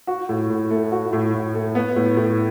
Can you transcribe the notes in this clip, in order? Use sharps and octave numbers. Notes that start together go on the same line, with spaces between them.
F#4
A2
A2
A3
F#4
A2
A2
A3
B3
A2
A2